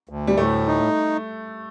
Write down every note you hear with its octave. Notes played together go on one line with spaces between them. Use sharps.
D2
G3
A2 A3
D#4